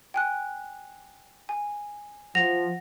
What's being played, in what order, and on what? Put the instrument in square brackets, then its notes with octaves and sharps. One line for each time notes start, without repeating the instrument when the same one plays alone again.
[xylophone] G5 G#5 F#6
G#5
[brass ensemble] F3 [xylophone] F#5 A#6 F7